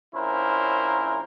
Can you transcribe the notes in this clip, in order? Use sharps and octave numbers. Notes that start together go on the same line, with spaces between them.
A#1 C#4 E4 A#4 C5